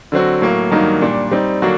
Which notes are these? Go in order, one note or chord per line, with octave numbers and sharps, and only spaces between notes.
D3 F#3 C4 F#4
A2 F#3 A#3
G2 D#3 F#3 A#3 D#4
A#2 G3 D4
G3 C4 D#4
D3 F#3 A#3 D4 F#4